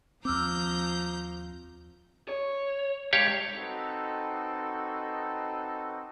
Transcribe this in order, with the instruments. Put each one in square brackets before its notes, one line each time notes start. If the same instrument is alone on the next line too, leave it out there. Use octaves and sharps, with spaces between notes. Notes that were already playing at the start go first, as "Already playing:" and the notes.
[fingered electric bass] D#2 C4 [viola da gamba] F3 [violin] A#5 G6 [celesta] D6 E6 F6
[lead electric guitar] C#5
[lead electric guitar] G2 G#3 [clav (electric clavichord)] G4 C#5 F5
[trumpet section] C4 D#4 F#4 A4 B4